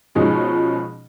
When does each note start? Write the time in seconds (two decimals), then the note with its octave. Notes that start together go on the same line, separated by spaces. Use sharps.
0.15 B2 F3 G#3 C#4 D#4